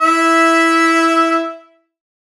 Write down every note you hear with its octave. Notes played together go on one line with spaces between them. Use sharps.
E4 E5